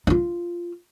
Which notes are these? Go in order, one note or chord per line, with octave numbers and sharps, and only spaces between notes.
D#4 F4